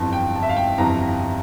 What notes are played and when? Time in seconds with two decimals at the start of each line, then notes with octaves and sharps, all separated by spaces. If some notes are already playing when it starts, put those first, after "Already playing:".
Already playing: G1 F2 E3 A5
0.13 G5
0.36 A5
0.43 E5
0.49 F5
0.57 G5
0.78 G1 F2 E3 A#5